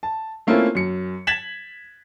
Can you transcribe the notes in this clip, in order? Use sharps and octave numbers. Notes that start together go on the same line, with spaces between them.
A5
A3 A#3 C4 C#4 E4 F4
F#2 C#7
G#6 A6 B6 E7 F#7